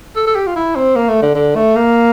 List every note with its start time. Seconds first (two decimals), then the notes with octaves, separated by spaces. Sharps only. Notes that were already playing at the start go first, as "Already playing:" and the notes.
0.16 A4
0.27 A4
0.35 G4
0.47 F4
0.56 E4
0.76 C4
0.96 A#3
1.09 A3
1.22 D3
1.35 D3
1.56 A3
1.76 A#3